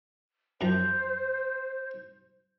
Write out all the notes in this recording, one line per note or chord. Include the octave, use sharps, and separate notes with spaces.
F#2 F3 C5 A#5